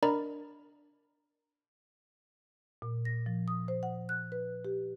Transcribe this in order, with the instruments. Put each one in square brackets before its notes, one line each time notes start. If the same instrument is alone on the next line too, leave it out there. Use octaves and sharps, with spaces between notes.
[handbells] D4 A#4 D5 D#5 A#5 B5
[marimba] A#2
A#6
F3
D#6
C5
F#5
F#6
B4
G4